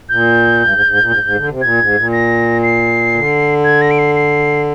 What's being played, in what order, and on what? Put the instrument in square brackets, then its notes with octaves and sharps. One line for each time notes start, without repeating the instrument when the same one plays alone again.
[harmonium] A#2 [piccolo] G6
[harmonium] G2
G#2
G#2
A#2
G#2
G#2
D3
C3
[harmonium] A#2 [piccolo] G#6
[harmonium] G#2
A#2
[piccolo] A#6
C7
[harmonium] D3
[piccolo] G#6
A#6
D7
C7
C7